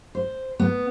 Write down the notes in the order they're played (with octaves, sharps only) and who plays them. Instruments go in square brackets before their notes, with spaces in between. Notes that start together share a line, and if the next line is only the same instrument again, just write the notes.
[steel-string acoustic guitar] C5
B3